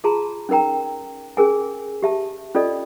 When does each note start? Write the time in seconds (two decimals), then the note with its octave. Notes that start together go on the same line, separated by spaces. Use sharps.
0.04 F4 G#4 A5 A#5 C6
0.49 C#4 D#4 A#4 G5 A#5
1.37 C#4 G#4 A#4 G#5
2.03 G4 E5 A5
2.55 C#4 F4 A4 D5 D#5